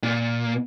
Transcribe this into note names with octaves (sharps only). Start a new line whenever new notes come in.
A#2